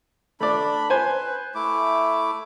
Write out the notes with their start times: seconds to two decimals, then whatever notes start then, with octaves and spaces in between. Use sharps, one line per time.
0.40 A3 D4 D5 B5
0.90 B4 C5 G#5
1.55 A3 E4 D6